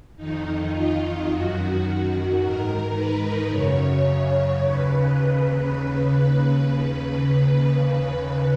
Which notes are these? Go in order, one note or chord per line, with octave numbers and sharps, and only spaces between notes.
F2 D#3 D#4
F4
F#2 D#3 F#4
F#4
G#2 D#3 A#4
B4
F#2 C#3 C#5
D#2 C#3 B4